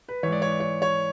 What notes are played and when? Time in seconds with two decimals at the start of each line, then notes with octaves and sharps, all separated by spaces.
0.09 B4
0.23 G#2 E3 C#5
0.32 D5
0.42 C#5
0.51 D5
0.60 C#5
0.82 C#5